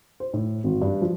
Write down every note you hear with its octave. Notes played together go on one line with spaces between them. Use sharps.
C5
A2
G#1
G2
F3